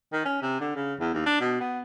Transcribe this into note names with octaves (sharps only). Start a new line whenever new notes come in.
D#3
C#4
C3
D3
C#3
E2
D#2
D4
B2
B3